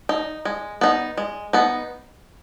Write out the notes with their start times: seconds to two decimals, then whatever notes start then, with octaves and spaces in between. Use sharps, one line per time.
0.09 D#4
0.45 G#3
0.81 B3 D#4
1.17 G#3
1.53 B3 D#4